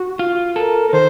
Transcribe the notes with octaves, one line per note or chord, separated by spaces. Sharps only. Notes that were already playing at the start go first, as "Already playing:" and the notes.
Already playing: F#4
F4
A4 A#4
A#4
D#3 C5